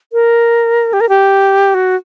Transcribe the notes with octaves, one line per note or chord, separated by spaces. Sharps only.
A#4
G4
A#4
G4
F#4